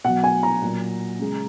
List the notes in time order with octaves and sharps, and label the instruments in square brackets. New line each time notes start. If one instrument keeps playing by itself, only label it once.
[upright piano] B2 F#3 F#5
G#5
A#5
A#2 F#3
C#3 G#3